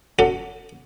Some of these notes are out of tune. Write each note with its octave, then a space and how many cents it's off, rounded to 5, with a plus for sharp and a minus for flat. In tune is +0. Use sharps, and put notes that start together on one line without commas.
C#4 +25 F#4 -5 A4 +30